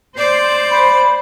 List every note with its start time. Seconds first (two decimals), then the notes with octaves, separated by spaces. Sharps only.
0.18 C5 D5
0.70 B5